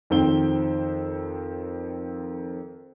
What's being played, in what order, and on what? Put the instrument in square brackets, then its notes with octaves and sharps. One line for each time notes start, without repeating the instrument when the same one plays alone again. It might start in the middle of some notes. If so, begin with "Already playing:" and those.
[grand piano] F2 D#3 C4 C5 G5 G7